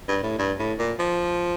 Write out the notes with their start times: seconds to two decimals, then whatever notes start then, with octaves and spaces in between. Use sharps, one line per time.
0.08 G2
0.23 A2
0.38 G2
0.59 A2
0.79 A#2
0.99 F3